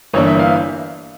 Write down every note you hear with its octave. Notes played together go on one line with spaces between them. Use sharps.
G1 G2 E3 A#3 D4 C#5
E5
F5